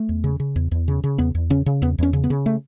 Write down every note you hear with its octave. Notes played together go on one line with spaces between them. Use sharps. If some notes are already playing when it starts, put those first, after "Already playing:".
Already playing: A3
E2
C#3
C#3
E2
E2
C#3
C#3
E2 B3
E2
C#3 C#4
C#3
E2 B3
E2 C#4
C#3
B3
C#3
A3